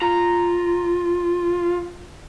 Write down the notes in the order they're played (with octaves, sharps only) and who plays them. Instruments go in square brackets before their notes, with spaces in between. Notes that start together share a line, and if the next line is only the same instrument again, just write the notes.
[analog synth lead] F4 [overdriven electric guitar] A#5